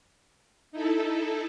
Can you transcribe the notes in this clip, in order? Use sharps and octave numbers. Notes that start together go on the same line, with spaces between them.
D#4 E4 A4